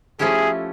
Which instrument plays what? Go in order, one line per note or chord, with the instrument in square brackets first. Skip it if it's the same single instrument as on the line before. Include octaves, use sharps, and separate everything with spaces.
[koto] F3 A3 C#4 E4 G4 [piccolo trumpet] G#4